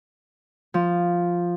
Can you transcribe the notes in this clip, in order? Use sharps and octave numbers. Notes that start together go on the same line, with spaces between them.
F3